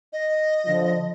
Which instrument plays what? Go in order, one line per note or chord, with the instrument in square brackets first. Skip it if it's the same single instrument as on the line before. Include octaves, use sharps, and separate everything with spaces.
[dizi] D#5
[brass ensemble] D3 F3